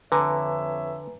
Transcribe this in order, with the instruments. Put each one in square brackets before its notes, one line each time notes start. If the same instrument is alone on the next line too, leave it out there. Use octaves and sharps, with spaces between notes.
[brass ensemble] F2 C#5 E5 [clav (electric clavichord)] D3 [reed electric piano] B4 G#5 A#5